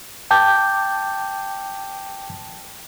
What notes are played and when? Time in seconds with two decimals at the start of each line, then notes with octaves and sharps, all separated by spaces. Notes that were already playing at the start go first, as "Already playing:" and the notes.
0.31 G5 A5 D6 G6